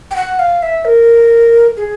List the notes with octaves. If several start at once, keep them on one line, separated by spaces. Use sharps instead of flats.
G5
F#5
F5
E5
A#4
G#4